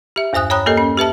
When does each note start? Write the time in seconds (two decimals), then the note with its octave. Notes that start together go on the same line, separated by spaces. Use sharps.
0.16 G4 E5
0.33 E2 G2 C5 G#5 D#6 F#6
0.50 C#5 G5 A#5 B5 D#6 F#6
0.66 A#3 G4 A4 A#4 D#5
0.77 C#4
0.98 G4 B4 E5 A5